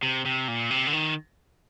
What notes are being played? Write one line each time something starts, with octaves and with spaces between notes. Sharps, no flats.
C3
C3
A#2
C3
D3
D#3